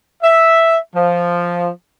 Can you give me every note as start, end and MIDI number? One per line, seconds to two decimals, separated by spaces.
0.23 0.77 76
0.96 1.68 53